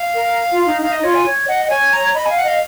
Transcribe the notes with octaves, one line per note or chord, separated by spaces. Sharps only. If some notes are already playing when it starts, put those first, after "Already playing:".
Already playing: F5
A#4
F4
D#4
D#4 F5
D#5
F4 C#5
G#5
C#5
D#5 F#5
F#5
C#5 G#5
A#5
D#5 B5
F5 G#5
F#5
D#5 F5